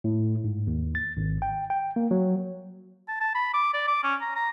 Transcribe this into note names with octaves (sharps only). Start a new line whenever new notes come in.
A2
G#2
D#2
A6
G#1
G5
G5
A#3
F#3
A5
A5
B5
D6
D5
D6
C#4
A#5
A#5